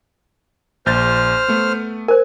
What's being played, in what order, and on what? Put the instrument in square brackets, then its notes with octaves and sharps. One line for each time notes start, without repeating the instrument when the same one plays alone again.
[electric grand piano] A#1 G6 A6 [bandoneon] C5 F6
[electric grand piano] A3 B3
[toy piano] A#4 C5 [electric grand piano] G#5